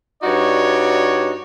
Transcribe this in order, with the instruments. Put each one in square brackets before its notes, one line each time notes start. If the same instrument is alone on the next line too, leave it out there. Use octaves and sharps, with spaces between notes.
[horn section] G2 D#4 F#4 C#5 D5